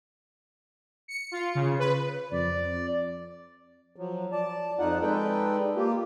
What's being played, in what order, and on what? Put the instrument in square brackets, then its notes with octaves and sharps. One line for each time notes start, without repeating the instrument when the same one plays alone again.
[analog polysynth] C#7
F4
C#3
B4
[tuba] F2 [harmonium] D5
[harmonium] F3 F#3
D5 A5
F2 D#4 F4 F#5
G#3 D#4 A4 B4 D5 G5
A#3 F4 G4